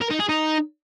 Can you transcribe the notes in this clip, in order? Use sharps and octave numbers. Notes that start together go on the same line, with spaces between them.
A#4
D#4
G#4
D#4